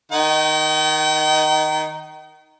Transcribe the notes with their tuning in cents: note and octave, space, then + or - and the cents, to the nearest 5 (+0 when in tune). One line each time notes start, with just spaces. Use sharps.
D#3 +0 D#4 +0 G5 -40